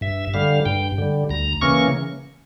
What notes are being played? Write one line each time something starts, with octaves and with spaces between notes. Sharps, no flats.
G2 E5
D3 G3 F5
G2 G5
D3 G3
D2 A#5
C#3 E3 A#3 C#4 C#6